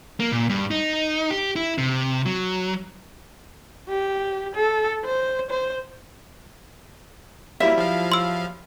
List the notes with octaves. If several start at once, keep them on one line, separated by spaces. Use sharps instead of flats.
A#3
A#2
G2
D#4
G4
E4
C3
F#3
G4
A4
C5
C5
F#3 G3 A#3 E4 E5
F3 F5
C6 E6